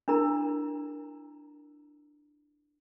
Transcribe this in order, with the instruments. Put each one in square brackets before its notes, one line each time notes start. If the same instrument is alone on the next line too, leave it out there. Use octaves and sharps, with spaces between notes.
[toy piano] D4 E4 A#4 A#5